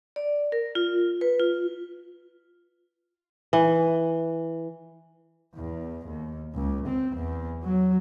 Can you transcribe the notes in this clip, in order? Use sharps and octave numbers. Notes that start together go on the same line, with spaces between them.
D5
A#4
F4
B4
F4
E3
E2
D#2
C#2
C4
E2
F#3